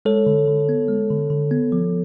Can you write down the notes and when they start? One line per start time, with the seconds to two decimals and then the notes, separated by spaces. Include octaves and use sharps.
0.05 G#3 A4 C#5
0.26 D3
0.48 D3
0.69 B3
0.88 G#3
1.10 D3
1.30 D3
1.51 B3
1.72 F3